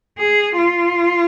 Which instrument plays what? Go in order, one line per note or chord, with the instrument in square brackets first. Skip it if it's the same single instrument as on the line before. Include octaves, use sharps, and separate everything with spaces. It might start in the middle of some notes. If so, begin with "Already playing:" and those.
[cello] G#4
F4